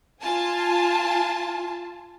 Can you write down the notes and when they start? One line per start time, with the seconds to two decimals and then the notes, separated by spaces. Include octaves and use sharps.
0.22 F4 G#5 A5